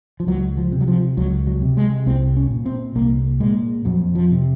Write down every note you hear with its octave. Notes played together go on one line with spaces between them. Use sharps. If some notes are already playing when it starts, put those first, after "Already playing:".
F3
C#2 F#3
F3
C3
F#3
F3
C#2 F#3
F#3
C3
G#3
C2 C4
C#4
A#2
C4
C2 A#3
A#2 G#3
F2 F#3
F3
C3